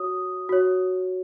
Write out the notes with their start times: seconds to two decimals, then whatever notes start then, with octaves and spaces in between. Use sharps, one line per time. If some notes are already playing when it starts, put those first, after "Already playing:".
Already playing: F#4 C#5 D#6
0.49 F#4 C#5